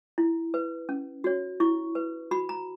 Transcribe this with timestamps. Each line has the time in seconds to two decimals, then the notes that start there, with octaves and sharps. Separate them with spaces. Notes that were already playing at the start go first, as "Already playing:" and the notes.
0.18 E4
0.54 B4
0.89 C#4
1.24 F#4 C#5
1.60 E4 C#6
1.95 B4
2.31 F#4 B5
2.49 A#5